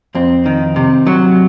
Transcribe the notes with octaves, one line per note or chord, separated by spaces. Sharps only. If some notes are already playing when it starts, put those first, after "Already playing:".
F2 C4
D#3
C3
F#3